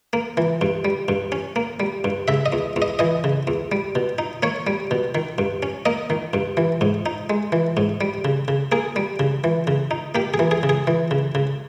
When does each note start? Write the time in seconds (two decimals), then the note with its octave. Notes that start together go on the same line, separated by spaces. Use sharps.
0.13 A#3
0.37 E3
0.61 G2
0.85 G3
1.08 G2
1.32 C#4
1.56 A#3
1.80 G3
2.04 G2
2.28 C#3 E5
2.46 D#5
2.52 E2
2.76 E2
2.82 D#5
2.99 E3 D#5
3.24 C#3
3.47 E2
3.72 G3
3.95 B2
4.18 D#4
4.43 A#3 C#5
4.67 G3
4.91 B2
5.15 D#3
5.38 G2
5.63 C#4
5.86 A#3 D#5
6.10 D#3
6.33 G2
6.57 E3
6.81 G#2
7.06 D#4
7.30 G#3
7.52 E3
7.77 G#2
8.01 G3
8.25 C#3
8.48 C#3
8.72 A#3 G#4
8.96 G3
9.19 C#3
9.44 E3
9.67 C#3
9.91 D#4
10.15 A#3 G4
10.34 G#4
10.39 E3
10.51 G#4
10.63 C#3
10.69 G#4
10.87 E3
11.11 C#3
11.35 C#3